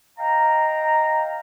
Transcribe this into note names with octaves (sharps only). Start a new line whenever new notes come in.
D#5 F5 G5 A#5